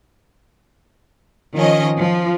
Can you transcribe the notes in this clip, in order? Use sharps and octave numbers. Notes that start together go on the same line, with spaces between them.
D#3 F3 C#4 D#5
F3